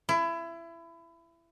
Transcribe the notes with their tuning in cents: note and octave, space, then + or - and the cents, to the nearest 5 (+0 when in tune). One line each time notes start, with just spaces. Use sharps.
E4 +25